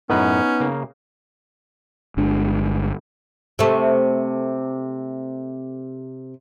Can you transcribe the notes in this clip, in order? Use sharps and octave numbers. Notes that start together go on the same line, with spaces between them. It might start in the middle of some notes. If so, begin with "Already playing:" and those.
F#2 A2 B3 C#4 D#4 B4
C#3 A#3
G1 G#3 D4
C3 A3